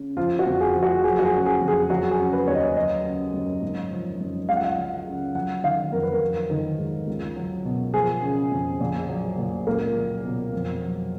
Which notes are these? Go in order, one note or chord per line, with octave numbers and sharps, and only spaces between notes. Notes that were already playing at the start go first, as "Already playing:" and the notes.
Already playing: C#3
F3 F4
F#4
F2
G#4
F3
F#4
F#3 G#4
F#4
G#4
C#3
G#4
F2
G#4
F#3 F#4
G#4
C#3
B4
D#2 C#5
D#5
F#3 D#5
C#3
F#2
G#1
F3
F#2
C#2 F5
F#5
F5
F#3
C#3
F#3 F#5
D#3 F5
F2 A#4
B4
A#4
F#3
D#3
G#2
C#2
F#3
B2
F3 G#4
C#3
F2
A#1
F#3
A#2
C#2 A#3
F#3
B2
F2
F#3